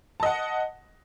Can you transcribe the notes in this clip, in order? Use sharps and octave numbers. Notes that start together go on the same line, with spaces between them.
D#5 F#5 A5